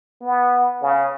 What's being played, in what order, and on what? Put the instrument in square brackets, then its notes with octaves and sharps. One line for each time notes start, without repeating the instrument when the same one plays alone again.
[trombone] B3
C#3